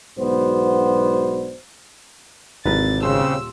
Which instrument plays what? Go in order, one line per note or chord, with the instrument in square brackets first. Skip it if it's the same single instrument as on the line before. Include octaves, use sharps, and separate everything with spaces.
[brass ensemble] B1 G#2 B3 D4 F#4 C5
[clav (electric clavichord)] G#1 B4 A#5 [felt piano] C3 E3 C4 [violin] A6
[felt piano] D#1 C6 E7 [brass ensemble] C#3 C4 [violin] E6